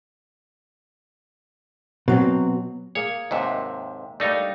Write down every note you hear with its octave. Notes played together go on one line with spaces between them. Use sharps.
B2 F#3 C4
A#3 G#4 C#5
D#2 G#2 C3 D#5 E5 F#5
G3 A3 A#3 D4 D#4 C#5